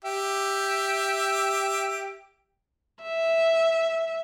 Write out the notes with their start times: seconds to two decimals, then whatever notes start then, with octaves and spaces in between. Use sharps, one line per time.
0.05 G4 E5
3.02 E5